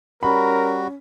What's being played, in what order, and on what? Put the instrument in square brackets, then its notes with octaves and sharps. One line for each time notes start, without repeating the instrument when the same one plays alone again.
[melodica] G3 F#4 [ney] C#4 [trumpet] A#4 [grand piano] B5